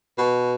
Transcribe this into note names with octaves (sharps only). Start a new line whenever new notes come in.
B2